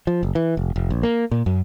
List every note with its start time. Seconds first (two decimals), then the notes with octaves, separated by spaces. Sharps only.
0.07 F3
0.23 F#1
0.35 E3
0.57 F1
0.76 F1
0.90 A#1
1.03 A#3
1.31 A#2
1.46 F#2